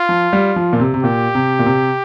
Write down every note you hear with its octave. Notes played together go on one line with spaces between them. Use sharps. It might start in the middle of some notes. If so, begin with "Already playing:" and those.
Already playing: F4
F3
G3
F3
A#2
C3
C3
A#2 G4
C3
A#2
C3